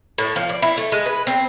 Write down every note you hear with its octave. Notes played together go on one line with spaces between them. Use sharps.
A2
F3
D5
E4
A3
G#3
B4
C4